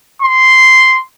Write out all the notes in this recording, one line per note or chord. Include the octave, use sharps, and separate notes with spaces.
C6